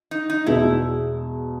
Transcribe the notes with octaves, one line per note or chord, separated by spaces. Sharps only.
D#4
D#4
E2 B2 G#3 E4